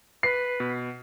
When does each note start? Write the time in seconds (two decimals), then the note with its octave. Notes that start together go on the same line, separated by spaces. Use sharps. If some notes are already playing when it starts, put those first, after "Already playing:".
0.23 B4 C7
0.60 B2